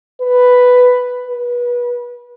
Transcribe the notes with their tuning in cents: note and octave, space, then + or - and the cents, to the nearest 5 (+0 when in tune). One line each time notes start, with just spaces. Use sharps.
B4 +5
B4 -30